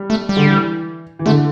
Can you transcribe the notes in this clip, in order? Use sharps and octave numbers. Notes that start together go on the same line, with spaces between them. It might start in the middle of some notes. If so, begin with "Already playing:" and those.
Already playing: G3
A3
G3
D3
E3
E3
D3 A3